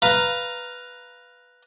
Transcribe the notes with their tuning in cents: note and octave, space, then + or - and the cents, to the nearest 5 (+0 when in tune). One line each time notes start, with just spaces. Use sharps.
B4 +0 F5 -5 A#5 +0